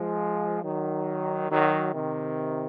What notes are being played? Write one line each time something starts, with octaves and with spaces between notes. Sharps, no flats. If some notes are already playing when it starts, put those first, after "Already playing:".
Already playing: F3 G#3
D#3 F#3
D#3 F#3
C3 D#3